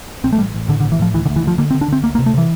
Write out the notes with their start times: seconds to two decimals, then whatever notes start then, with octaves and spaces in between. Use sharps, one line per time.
0.24 A1 C4
0.33 A3
0.38 A1 G3
0.54 A1
0.68 A2 D3
0.80 D3
0.84 A1
0.92 E3
0.99 A2 F3
1.14 D2 E3
1.26 D3
1.29 D2
1.36 E3
1.43 D2 F3
1.58 D3 A#3
1.71 C4
1.74 D3
1.81 D4
1.88 D3 C4
2.04 D2 A#3
2.15 A#3
2.19 C3
2.26 A3
2.34 C3 E3